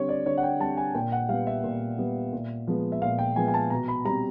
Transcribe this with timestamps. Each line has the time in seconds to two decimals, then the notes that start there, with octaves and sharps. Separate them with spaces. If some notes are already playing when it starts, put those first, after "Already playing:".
Already playing: D3 G3 C4 C#5
0.09 D5
0.26 D3 C#5
0.38 F#5
0.43 G5
0.60 G3 C4 A5
0.77 G#5
0.95 A#2 G5
1.12 F#5
1.29 G3 B3 F5
1.47 E5
1.64 A#2
1.98 G3 B3
2.33 A#2
2.67 F3 G#3 B3
2.92 E5
3.02 A#2 F5
3.19 G5
3.36 F3 G#3 B3 G#5
3.48 G#5
3.54 A5
3.70 B2 A#5
3.88 B5
4.05 G3 C4 A#5